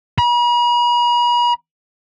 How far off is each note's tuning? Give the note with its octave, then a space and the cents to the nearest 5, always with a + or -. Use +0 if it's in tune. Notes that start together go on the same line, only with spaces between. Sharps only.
B5 -45